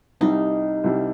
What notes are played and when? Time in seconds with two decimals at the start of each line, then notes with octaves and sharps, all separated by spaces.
0.21 C2 C3 G3 D#4
0.84 C2 C3 G3